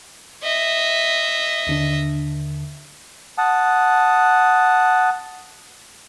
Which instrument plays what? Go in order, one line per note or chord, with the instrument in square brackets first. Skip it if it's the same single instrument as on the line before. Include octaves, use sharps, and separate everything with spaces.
[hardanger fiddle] D#5 E5
[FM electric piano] D#2 D3 D4
[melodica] F#5 A5 D#6